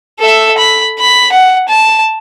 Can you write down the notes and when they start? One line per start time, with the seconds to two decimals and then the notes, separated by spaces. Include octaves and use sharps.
0.20 A4 E5
0.57 B5
0.99 B5
1.32 F#5
1.68 A5